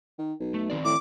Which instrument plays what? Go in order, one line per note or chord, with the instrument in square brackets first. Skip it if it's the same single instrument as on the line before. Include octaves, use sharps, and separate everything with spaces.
[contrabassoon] D#3
B1
[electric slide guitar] A3
D#3 C4 D5
[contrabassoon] A2 [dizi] D6